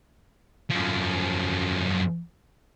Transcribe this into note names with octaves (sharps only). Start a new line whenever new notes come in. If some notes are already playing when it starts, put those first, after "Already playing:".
F#2 F3